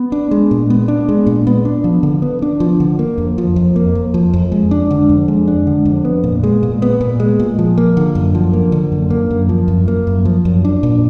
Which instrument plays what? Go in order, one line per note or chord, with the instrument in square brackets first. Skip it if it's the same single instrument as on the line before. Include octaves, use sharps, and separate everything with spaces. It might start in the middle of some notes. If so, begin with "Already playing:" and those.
Already playing: [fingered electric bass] B3
D4
G#3
A#2
B3
D4
G#3
A#2
B3
D4
F3
D3
B3
D4
F3
D3
A#3
F2
F3
F2
A#3
F2
F3
F2
G#3
D4
D3
F2
G#3
D4
D3
F2
B3
A#2
G#3
A#2
B3
A#2
G#3
A#2
F3
A#3
D3
F#2
F3
A#3
D3
F#2
A#3
F#2
F3
F#2
A#3
F#2
F3
F#2
D4
A#2